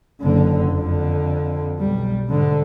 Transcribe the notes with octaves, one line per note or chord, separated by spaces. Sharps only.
F#1 D3
F2 D3
B1 G3
G#2 D3